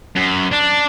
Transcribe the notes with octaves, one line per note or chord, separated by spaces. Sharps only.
F#2
D4